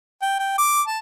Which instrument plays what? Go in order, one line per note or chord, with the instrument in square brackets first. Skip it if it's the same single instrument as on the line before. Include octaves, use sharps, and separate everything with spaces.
[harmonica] G5
G5
D6
A5